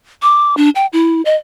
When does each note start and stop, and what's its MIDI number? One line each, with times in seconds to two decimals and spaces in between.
0.22 0.55 86
0.57 0.70 62
0.75 0.86 79
0.93 1.22 64
1.25 1.36 75